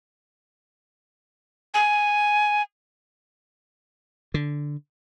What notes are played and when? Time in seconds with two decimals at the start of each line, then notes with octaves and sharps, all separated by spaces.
1.74 G#5
4.34 D3